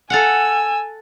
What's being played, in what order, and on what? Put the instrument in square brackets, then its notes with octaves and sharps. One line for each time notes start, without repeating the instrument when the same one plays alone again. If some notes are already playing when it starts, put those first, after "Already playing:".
[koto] A4 F5 F#5 [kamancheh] G#5 E6